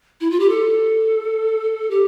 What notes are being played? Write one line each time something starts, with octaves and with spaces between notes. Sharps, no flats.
E4
F4
G4
A4
G4